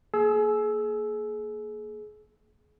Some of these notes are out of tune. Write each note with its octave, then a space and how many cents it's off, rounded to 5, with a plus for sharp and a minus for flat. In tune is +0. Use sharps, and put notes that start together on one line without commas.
A#3 +0 G#4 +30 E6 +0